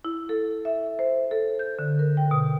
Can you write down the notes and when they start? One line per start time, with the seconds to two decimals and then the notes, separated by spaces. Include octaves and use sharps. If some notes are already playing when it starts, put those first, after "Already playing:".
0.05 E4
0.29 A4
0.65 E5
0.99 C5
1.31 A4
1.59 G6
1.79 D3
1.99 A#4
2.17 G5
2.31 B2